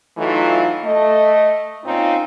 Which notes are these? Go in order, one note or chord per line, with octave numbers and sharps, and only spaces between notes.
E3 F#3 A3 D#4 F4
A3 D#5
A#2 C4 C#4 D#4 F4